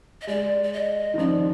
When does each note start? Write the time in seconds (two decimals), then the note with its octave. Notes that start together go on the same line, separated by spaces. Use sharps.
0.22 D#5
0.27 G#3 D5
0.63 D5
0.73 D#5
1.14 D#3
1.18 F3 D5